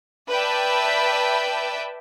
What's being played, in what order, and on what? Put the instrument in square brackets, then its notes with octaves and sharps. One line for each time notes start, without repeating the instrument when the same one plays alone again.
[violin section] B4 D5 E5 G5 A5 B5